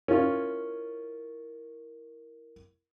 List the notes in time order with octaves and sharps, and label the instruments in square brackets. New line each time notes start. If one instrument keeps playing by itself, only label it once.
[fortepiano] C#4 F4 C#5 [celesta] E4 A#4